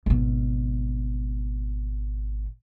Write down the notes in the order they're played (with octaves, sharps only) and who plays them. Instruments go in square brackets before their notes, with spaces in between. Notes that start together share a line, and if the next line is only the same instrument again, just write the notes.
[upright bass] G#1 B2